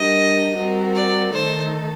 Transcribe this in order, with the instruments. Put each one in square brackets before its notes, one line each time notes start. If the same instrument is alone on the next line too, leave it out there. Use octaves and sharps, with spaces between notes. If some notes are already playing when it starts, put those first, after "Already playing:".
Already playing: [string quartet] G3 D4 G4 A#4 [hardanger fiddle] D#5
[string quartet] G3 C4 F#4 A#4
[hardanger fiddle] D5
[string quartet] D#3 A3 D#4 A4 [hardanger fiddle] C5